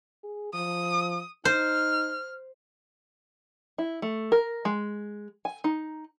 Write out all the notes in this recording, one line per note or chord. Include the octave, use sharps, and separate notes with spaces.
G#4
F3 D#6
D#4 C5 F6
E4
A3
A#4
G#3
G#5
D#4